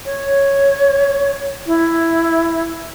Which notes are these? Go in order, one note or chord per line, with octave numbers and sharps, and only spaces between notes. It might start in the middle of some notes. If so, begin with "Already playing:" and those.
C#5
E4